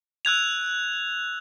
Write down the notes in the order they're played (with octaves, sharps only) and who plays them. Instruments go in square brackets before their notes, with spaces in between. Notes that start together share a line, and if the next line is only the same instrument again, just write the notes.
[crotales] E6 F#6 G#6 F7